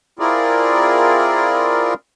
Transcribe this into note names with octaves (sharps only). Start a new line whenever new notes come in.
C4 E4 F4 G#4 A#4 D5